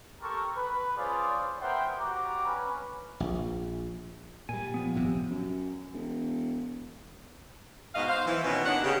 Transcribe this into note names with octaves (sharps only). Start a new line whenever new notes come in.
G4 A4 A#4 A5 C6 C#6
B4
C#4 F4 G#4 C5 D5
B3 A#4 C5 E5 F#5 G5
F#4 G4 D5 A#5 D6
C#4 B4
A#1
A#2 G3 G#5
F3 B3
D1 G#1 C3
F#2
E1
G#2 B2 F#4 D#5 F5
C5 F5
E3
B2 D#3 C#4
D#2 D3 D#3 D4 D5 F#5
C#3 G4